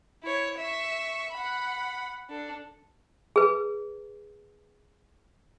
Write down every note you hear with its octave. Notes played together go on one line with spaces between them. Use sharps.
E4 C#5
E5 C#6
F#5 B5
D4 A4
G#4 B4